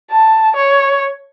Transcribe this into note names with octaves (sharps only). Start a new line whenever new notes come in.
A5
C#5